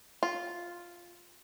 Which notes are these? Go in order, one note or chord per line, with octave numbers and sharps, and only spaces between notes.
F4